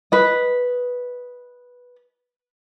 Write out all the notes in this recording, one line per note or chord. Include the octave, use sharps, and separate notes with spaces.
B4 D#5